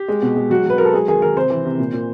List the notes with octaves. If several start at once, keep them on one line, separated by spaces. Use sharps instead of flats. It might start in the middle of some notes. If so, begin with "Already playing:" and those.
Already playing: G4
G#3
B2
G#3
F#3 F#4
F#3
B4
F#3 A#4
A4
G#3 G#4
D#3 G#4
D#3 A#4
C3 C5
E3
C3
A#2
A#2